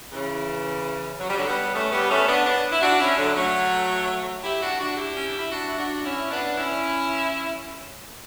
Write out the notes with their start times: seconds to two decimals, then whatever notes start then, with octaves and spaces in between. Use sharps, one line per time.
0.12 C#3 E3
1.20 F#3
1.29 G3
1.37 D3 F#3
1.47 G3 B3
1.74 A3 C#4
1.91 G3 B3
2.09 A3 C#4
2.27 B3 D4
2.45 B3 D4
2.71 E4
2.82 D4 F#4
3.00 C#4 E4
3.17 D3 F#3
3.35 F#3 A3
4.42 E4 G4
4.61 D4 F#4
4.79 D4 F#4
4.97 E4 G4
5.15 C#4
5.27 D4
5.39 E4
5.50 D4 F#4
5.66 E4
5.77 D4 F#4
6.05 C#4 E4
6.31 B3 D4
6.58 C#4 E4